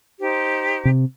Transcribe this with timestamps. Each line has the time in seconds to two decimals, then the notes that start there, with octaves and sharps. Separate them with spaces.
0.20 D#4 G4 C5
0.85 C3